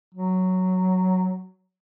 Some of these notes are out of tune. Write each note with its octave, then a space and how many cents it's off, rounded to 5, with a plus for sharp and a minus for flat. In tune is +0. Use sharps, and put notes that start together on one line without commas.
F#3 +0